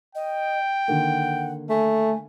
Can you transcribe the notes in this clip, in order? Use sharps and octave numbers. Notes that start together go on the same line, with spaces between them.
D#5 G5
D3 D#3 A#3 F#5
A3 G#5